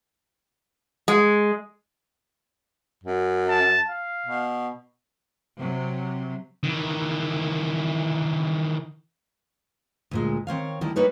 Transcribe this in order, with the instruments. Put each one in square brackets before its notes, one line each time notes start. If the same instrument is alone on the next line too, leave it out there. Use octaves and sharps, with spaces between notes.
[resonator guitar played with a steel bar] G#3
[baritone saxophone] F#2
[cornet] A5
F5
[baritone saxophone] B2
[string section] C3 F#3
[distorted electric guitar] D#3 E3
[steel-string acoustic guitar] D2 A#2 G#3
D#3 C4 C#5 F5
D2 D#3 G3 E4 A4
G3 A#3 D#4 B4 C#5